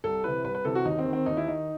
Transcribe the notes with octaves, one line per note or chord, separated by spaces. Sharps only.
C2 A4
C3 E3 B4
C2 B4
B4
C3 E3 A4
F#4
D#2 D#4
C4
D#3
C4
D#2 D#4
E4
D#3 D#4